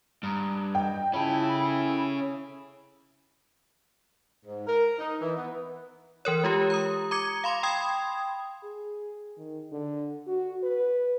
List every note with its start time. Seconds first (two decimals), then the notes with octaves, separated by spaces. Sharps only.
0.23 G2 A#5 D#6
0.75 D#5 G5
1.14 C#4 E4 F4 G#4 A5 B5
1.53 A4 G#5 B5
4.45 G#2
4.67 A#4
4.99 D#4
5.21 E3
5.36 B3
6.25 E3 A#4 C#5
6.43 G#3 F4 G4
6.70 A#5 D#6
7.11 A#5 D6 G#6 C#7
7.44 F5 B5 C6
7.63 G5 B5 C6 D#6 G#6
8.64 G#4
9.38 D#3
9.72 D3
10.27 F#4
10.63 B4